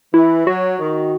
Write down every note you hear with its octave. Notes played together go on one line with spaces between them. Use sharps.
E3 E4
F#3 F#4
D#3